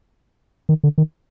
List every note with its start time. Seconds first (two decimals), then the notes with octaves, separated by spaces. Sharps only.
0.69 D#3
0.84 D3
0.98 D#3